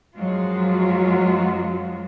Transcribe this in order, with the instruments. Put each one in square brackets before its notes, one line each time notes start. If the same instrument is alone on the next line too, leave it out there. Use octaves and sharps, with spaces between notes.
[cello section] F#2 F3 F#3 G#3 F4 F#4